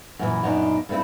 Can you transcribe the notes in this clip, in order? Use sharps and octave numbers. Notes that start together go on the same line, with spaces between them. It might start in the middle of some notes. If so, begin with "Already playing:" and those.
F#2 A#2 E3
F#2 A#2 B3 D4 D#4
G2 A3 C4 E4